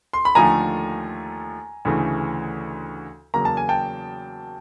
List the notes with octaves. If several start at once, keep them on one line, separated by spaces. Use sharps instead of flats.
C6
B5
D#2 D3 F3 A3 G#5 A#5
D2 C#3 E3 A3
E2 C#3 F#3 A#3 A#5
A5
G#5
G5 A5